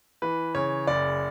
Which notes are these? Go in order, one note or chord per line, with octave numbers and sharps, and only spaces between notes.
E3 B4
C#3 C#5
F#1 D5